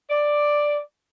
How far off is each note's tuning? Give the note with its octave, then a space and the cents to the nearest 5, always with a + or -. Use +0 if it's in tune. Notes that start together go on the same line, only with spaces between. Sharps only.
D5 +5